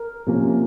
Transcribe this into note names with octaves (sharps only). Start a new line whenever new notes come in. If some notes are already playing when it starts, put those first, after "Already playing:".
Already playing: A#4
C3 F3 A#3 C#4